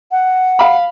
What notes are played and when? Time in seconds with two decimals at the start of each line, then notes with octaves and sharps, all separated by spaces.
0.11 F#5
0.59 F5 B5